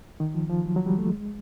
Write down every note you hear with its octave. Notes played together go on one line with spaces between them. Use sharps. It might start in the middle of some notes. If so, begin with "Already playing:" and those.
D#3
F3
F3
F#3
F#3
G3
A3
G#3